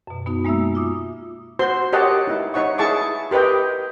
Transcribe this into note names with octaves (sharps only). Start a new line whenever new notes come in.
F#2 B2
B3 D#4 F#4
G#3 A#3 D#4 E5 E6
F4 D6 D#6
F#4 C5 C6
G4 A#4 C#5 D#5 F#5 A5
D#4 E4
D#4 C#5 F#5 C#6
E4 G#4 A5 C#6 D6
G4 A#4 B4 D#5 G5